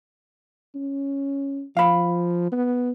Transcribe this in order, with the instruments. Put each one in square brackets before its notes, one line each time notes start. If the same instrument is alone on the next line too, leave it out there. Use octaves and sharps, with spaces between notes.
[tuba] C#4
[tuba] F3 [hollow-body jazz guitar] F5 B5
[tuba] B3